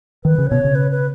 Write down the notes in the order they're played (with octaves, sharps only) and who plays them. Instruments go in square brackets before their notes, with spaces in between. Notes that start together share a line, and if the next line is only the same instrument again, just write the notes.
[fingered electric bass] D#3 [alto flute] B4
[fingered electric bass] C#3
[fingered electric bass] B2 [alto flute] C#5
[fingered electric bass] C#3
[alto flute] B4
B4